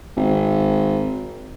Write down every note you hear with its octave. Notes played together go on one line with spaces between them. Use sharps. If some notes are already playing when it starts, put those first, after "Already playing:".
G#1